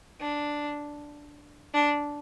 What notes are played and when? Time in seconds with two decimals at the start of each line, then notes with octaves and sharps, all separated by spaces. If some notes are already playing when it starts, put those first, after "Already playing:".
0.21 D4
1.74 D4